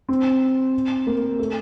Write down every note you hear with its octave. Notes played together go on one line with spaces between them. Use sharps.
C4
A#3
A3